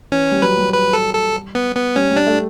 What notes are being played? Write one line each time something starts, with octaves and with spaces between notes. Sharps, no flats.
E3 C#4
G3
F#3 B4
G3
B4
A4
A4
B3
B3
G3 C#4
G3
D4
A3